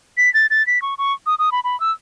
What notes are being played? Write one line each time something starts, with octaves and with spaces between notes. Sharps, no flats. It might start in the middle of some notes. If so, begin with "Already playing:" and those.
B6
A6
A6
B6
C#6
C#6
D#6
D#6
B5
B5
E6